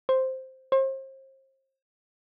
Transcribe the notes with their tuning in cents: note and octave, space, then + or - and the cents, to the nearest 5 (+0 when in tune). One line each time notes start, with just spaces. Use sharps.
C5 +0
C5 +35